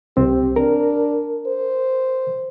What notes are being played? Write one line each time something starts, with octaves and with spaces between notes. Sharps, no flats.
C2 C4 G4
D4 A#4
C5